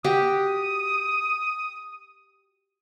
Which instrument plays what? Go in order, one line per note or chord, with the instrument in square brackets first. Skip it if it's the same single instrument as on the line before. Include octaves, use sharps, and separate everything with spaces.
[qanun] F#4 G4 [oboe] D#6